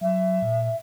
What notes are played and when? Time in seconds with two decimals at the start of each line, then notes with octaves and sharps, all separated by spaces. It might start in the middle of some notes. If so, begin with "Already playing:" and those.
0.01 F#3 E5
0.42 A#2